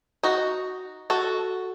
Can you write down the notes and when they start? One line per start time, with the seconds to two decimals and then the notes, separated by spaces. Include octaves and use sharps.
0.23 D#4 F#4
1.10 F#4 A4